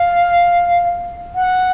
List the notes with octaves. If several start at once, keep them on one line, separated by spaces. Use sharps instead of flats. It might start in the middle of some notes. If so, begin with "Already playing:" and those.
Already playing: F5
F#5